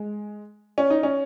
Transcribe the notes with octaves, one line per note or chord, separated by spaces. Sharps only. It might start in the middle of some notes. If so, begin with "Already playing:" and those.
Already playing: G#3
C#4
D#4
C#4